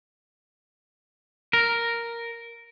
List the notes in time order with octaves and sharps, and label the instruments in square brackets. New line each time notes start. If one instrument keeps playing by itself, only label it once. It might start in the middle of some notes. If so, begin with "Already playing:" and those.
[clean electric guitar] A#4